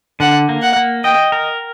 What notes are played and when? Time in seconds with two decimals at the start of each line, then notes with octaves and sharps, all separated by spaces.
0.20 D3 F#5
0.49 A#3
0.62 F#5
0.76 A#3
1.04 D#5 G5
1.32 A#4